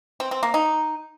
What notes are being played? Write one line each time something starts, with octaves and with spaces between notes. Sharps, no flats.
C4
C4
A#3
D#4